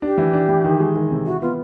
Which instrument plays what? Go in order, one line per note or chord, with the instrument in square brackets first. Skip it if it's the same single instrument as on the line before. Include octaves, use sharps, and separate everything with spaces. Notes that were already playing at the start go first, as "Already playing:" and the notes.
[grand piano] D4 [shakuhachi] G4
[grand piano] E3
D4
E3
D#3
G#3
D#3
C3
[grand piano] E4 [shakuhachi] F#4
[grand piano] B3 [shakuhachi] F4